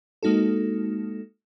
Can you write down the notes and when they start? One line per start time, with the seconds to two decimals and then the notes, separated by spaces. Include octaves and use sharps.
0.23 G#3 A#3 D#4 F#4 A4